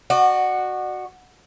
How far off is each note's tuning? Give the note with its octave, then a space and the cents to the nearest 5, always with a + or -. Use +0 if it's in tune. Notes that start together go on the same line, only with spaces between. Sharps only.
F#4 +0 D5 +40